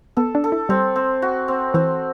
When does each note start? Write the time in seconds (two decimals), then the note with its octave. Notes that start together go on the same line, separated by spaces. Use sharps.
0.17 B3 A4
0.35 D4
0.44 A4
0.52 E4
0.69 G3 C4
0.96 C4
1.22 F#4
1.48 C4
1.74 E3 C4